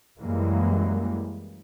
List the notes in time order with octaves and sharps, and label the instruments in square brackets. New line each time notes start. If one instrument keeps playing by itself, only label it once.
[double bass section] F#2 E3 G3 G#3 A#3